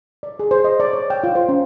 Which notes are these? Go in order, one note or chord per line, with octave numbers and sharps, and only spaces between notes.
D5
G#4
C5
D#5
D5
C#5
G5
F4
C5
C#4